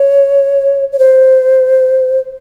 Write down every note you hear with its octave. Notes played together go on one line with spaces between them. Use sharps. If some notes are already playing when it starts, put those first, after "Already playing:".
Already playing: C#5
C#5
C5